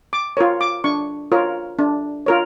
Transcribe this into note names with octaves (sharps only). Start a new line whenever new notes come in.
D6
F4 A#4 C#5
D6
D4 C#6
F4 A#4 C#5
D4
F4 A#4 C#5